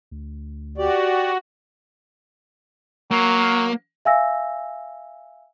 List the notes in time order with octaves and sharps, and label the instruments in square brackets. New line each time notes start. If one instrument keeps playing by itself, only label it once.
[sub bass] D2
[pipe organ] F#4 [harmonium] G4 D5
[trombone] F#3 [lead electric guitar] A#3
[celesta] E5 F5 G#5 E6 A#6